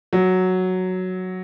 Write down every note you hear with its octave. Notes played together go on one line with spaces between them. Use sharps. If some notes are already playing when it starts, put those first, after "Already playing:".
F#3